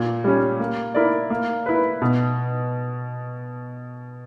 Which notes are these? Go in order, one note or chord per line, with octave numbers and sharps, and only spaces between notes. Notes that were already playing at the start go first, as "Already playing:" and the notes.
Already playing: A#2
G3 C#4
A#3
E4 A#4 D5
A#3
E4 B4
B2